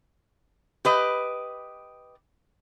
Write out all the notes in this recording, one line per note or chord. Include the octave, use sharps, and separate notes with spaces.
G4 B4 D#5